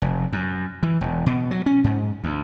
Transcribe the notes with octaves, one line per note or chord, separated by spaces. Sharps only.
F1
F#2
E3
E1
B2
F#3
C#4
G#2
D2